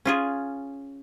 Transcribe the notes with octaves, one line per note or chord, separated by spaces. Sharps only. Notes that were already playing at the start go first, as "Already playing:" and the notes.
C#4 F4 G#4